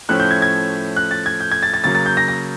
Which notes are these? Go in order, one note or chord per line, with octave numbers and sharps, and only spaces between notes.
A2 F3 A3 C#4 E4 F#6
G6
G#6
G#6
F#6
A6
G#6
G6
G#6
A6
A6
C#3 F#3 A#3 A6
A6
G6
A#6
A#6